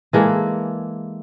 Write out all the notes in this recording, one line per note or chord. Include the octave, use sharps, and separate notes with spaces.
E3 G#3 A#3 A4